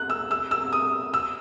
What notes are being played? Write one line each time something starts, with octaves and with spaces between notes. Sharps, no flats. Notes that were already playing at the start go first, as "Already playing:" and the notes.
Already playing: F#6
E6
E6
E6
D#6
E6